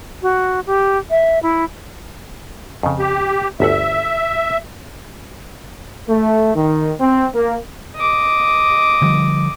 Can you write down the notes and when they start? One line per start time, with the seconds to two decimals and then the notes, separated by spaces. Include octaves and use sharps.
0.22 F#4
0.67 G4
1.10 E5
1.43 E4
2.83 F2 C#3
2.99 G4
3.60 G1 D2 E5 F#5
6.09 A3
6.55 D#3
7.00 C4
7.35 A#3
7.96 D#5 D6
9.02 D3 F3 G3